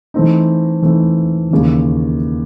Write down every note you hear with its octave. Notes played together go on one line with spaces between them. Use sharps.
E3 A3 C4 D#4
E3 A3 C4 D#4
D#2 C#3 E3